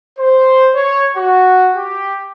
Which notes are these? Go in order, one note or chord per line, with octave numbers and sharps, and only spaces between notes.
C5
C#5
F#4
G4